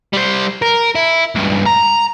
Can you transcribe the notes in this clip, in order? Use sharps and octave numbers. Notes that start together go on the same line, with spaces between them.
G3 C5
A#4
E4
C#2 G2
A#5